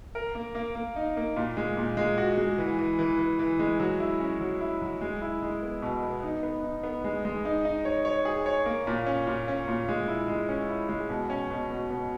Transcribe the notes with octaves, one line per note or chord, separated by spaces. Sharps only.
A#4
A#3
A#3
A#3
D#4
A#3
A#2
G#3
A#2
G#3
F#4
G#3
E3
E3
E3
E3
E3
G#3
F#3
E4
C#4
F#3
E4
F#3
G#3
E4
G#3
B3
B2
B3
D#4
B3
D#4
B3
G#3
G#3
D#4
D#4
C#5
C#5
G#4
C#5
A#3
A#2
C#4
A#2
C#4
A#2
G#3
E4
G#3
C#4
E4
G#3
B2
C#4
B2
B2
B2